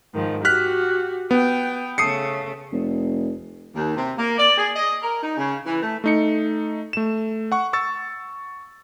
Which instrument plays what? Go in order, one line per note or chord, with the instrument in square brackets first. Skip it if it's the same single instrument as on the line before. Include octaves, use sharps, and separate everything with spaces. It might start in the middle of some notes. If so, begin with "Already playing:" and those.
[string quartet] G#2 D#3 F3
[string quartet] F#4 G4 [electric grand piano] F6 F#6 B6
[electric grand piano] B3 [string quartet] G5
[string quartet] C#3 A3 [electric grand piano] D#6 C7 C#7
[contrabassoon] F1
[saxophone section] D#2
C3
A#3
D5
G#4
D#5
A#4
D#4
C#3
E3
A3
[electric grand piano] A3 D#4 C#7
A3 E7
F#5 C#6
C#6 E6 A6